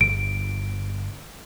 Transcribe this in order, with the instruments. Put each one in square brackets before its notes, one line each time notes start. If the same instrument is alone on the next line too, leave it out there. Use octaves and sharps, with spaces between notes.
[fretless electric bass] G1 [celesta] D7